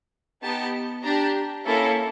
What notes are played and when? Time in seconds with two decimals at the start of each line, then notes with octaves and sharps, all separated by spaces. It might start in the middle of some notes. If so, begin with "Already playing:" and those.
0.42 B3 D#4 G4 A5
1.03 D4 G4 A#5
1.65 A#3 C#4 E4 A4